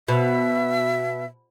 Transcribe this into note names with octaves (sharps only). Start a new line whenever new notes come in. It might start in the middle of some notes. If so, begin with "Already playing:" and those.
B2 E5